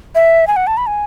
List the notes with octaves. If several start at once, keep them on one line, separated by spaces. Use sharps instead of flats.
E5
G#5
F#5
A5
B5
G#5